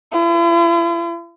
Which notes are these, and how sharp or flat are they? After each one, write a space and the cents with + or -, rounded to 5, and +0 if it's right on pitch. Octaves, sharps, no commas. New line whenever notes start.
E4 +45